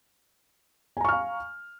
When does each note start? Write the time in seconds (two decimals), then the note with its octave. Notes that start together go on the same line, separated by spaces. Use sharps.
0.97 G#5
1.01 A#5
1.05 C#6
1.09 F6
1.12 F5